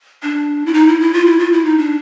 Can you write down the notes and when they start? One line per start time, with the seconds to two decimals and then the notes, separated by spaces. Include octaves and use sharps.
0.23 D4
0.66 E4
0.74 D#4
0.87 E4
1.00 E4
1.13 F4
1.26 E4
1.39 F4
1.52 E4
1.65 D#4
1.78 D4